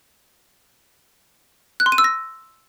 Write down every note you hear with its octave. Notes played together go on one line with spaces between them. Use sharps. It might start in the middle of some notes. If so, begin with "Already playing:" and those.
F#6
C6
D#7
E6
A#6